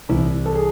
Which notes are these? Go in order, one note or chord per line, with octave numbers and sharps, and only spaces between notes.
C2 C3 E3 E4
A4
G#4